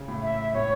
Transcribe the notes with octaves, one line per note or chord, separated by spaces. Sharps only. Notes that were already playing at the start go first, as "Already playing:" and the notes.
Already playing: C#3
A2
E5
A2 C#5